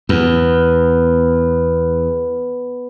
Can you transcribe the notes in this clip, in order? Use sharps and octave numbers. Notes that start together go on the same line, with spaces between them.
E2 B3